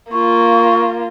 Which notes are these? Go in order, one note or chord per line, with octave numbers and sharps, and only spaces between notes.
A#3 F4 C#6